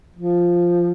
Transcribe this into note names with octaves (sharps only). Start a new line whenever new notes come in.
F3